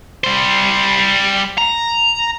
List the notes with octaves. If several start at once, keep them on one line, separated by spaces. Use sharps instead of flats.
G3 C5
A#5